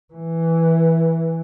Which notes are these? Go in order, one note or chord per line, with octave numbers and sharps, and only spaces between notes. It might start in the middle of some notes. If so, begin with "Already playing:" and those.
E3